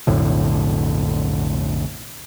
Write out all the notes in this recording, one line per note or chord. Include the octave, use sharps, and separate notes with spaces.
B1 F2 A2 D3